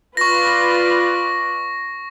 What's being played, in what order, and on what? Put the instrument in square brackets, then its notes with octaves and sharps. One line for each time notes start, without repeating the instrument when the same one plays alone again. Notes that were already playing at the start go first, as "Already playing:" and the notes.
[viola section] F4 B4 D5 [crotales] C#6 A#6